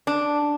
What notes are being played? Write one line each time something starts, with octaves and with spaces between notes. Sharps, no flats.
D4